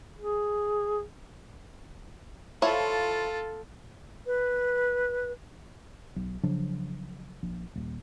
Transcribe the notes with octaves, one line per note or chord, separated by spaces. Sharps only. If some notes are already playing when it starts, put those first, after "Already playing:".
G#4
F3 E4 F4 A4 C#5
B4
B1
C#3 F3 F#3 D4
A#1
D#1